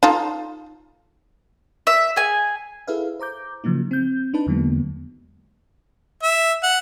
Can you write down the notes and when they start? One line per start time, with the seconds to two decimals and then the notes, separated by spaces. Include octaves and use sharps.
0.03 D#4 F4 A4
1.87 E5
2.16 G#4 G#5
2.87 E4 G#4 A4 B4 E5 F5
3.20 C5 A#5 D6 G6
3.64 C#3 F3 F#3 A#3 D#4
3.91 C4 G6
4.34 D4 D#4 B4 A5
4.47 E2 D3 F#3 G#3 A#3 B3
6.23 E5
6.63 F#5